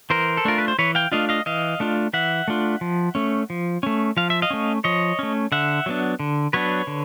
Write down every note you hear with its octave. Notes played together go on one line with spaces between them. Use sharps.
E3 A#4 C5
A4
A3 D4 F4 A#4
B4
C5
E3 B4 C#5
F5 G5
A3 D4 F4 D#5 F5
D#5 F5
E3 D#5 F5
A3 D4 F4
E3 E5 F#5
A3 D4 F4
F3
A3 C#4
F3
A3 C#4
F3 F5
E5
D#5 F5
A3 C#4
F3 C#5 D#5
A3 C#4
D3 E5 F#5
F#3 B3 D4
D3
F#3 B3 D4 B4 C#5
D3